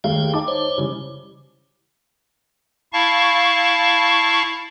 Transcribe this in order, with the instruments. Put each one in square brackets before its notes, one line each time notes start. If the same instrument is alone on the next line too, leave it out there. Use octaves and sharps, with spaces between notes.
[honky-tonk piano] D#2 A3 F5 [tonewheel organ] G#4 G5
[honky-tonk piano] D#4 A5 D6
[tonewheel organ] C5 C#5
[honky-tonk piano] C#3 E3 G3
[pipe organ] E4 F5 A5 C#6